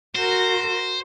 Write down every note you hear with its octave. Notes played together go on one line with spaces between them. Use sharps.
F#4 A#4 C5